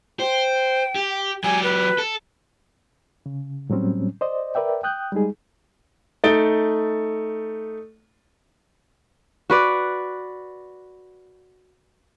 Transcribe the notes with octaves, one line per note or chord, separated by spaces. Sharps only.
C5 G5
G4
F#3 G4 G#5
B4
A4
C#3
A2 F#3 G3 C4 C#4
C5 D5 D#5
A#4 B4 D5 E5 G5
G5 D#6 F#6 G6
G3 G#3 D#4 G#4
A3 D#4 D#6 A6 D7 G7
F#4 B4 D5